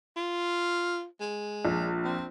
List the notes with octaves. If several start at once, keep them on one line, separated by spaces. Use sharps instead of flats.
F4
G#3
A#1
C4